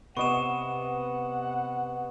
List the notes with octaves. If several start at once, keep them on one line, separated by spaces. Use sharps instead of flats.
C3 B3 D#5 F#5 C#6 E7